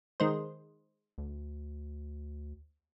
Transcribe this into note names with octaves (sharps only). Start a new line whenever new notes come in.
D#3 G#3 C5
D2